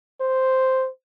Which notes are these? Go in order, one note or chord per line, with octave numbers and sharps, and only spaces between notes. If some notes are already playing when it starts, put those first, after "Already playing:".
C5